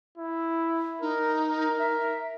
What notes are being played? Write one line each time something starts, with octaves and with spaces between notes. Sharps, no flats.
E4
D#4 A#4
A#4
E5